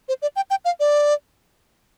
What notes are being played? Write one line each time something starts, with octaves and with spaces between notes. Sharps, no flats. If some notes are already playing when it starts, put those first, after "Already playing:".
C5
D5
G5
G5
F5
D5